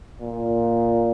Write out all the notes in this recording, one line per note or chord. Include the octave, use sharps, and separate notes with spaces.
A#2